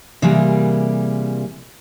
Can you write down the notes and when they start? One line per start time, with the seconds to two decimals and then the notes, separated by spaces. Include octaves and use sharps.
0.22 C3 E3 G3 A#3 G#4